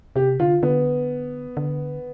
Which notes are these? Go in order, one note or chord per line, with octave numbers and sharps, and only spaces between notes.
C3 G4
D3 F4
D3 B3
D3